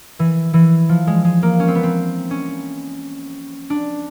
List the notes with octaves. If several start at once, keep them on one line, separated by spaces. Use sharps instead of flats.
E3
E3
F3
G#3
G#3
A#3
C#4
C4
B3
C4
C#4
D4